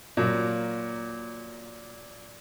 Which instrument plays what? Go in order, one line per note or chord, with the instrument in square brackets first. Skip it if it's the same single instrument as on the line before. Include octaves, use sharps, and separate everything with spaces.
[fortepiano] A#2 F#3 A#3